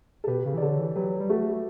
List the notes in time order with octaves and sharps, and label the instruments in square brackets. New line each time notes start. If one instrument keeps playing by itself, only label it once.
[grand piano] A4
[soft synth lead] B2 [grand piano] G4 B4
[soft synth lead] C#3
E3
[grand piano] D5
[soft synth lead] D3 [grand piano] A4 C#5
[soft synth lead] E3
[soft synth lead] F#3 [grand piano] G4 B4
[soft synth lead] G3
[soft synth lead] A3 [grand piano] F#4 A4